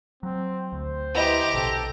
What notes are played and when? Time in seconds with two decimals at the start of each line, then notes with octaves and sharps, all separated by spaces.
0.23 F#3 C4
0.73 D2 C5
1.15 B3 E4 G4 D#5 A#5
1.54 A#1 B2 A4